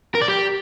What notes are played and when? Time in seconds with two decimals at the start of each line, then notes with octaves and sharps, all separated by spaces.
0.15 A#4
0.21 D5
0.28 G4